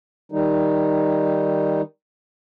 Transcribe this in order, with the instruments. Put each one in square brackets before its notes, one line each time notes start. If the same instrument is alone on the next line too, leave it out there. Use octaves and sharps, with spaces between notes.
[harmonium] D#3 G3 D#4